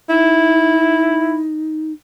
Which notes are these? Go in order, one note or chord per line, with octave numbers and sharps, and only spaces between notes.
D#4 E4